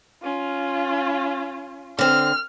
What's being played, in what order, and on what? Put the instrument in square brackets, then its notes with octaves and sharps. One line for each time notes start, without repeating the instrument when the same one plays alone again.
[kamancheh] C#4 F4
[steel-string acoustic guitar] D3 C4 C5 [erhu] F6